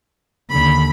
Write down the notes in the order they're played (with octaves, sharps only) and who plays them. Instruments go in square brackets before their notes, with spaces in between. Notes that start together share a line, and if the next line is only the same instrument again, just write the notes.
[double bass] D#2 D3 [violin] B5